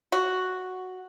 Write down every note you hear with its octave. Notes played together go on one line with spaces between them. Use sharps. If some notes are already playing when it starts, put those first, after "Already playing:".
F#4